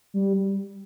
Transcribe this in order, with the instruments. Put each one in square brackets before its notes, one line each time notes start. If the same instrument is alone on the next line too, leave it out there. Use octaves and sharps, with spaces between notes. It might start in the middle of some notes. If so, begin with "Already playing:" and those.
[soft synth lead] G3